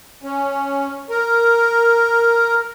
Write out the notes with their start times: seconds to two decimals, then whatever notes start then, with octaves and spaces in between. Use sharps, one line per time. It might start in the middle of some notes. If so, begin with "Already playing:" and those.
0.23 C#4
1.10 A#4